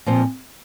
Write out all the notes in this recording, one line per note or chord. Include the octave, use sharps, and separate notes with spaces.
A#2 F3 C4